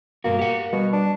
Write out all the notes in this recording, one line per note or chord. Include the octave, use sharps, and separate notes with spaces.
G2 B2 A#3 F#4
G4 F#5
B2 G3
D4